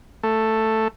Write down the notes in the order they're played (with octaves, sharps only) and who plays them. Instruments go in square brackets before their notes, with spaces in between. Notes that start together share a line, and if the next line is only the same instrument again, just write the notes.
[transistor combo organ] A3